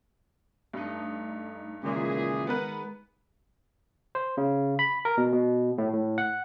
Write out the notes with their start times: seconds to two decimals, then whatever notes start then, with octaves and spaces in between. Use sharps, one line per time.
0.73 G2 A3 D#4
1.83 C#2 A#2 D#3 E3 G#3 G#4
2.47 B3 A#4 B4 F#5
4.15 C5
4.37 C#3
4.79 B5
5.05 A#4
5.17 B2
5.33 B2
5.78 A2
5.93 A2
6.18 F#5